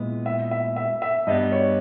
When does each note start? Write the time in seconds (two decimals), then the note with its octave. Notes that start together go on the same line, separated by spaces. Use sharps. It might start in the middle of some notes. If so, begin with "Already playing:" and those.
Already playing: A#2 G#3 B3 E4
0.26 E5
0.51 E5
0.76 E5
1.02 E5
1.27 G2 G3 B3 D#5
1.52 C#5